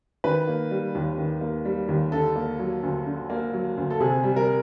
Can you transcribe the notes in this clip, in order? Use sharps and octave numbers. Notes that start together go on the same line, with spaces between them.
D#3 B4
A#3
G3
D#2
D#3
A#3
G3
D#2
D3 A4
A#3
F#3
D2
D3
A#3
F#3
D2
A4
C3 G#4
G3
A#4